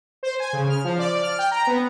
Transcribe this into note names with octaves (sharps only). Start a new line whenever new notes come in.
C5
G#5
C#3
F6
F3
D5
F6
G5
A#5
B3